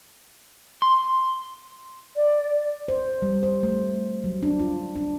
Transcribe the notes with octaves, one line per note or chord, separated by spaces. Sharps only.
C6
D5
C5
G3
C5
A3
F#3
D4
F4
D4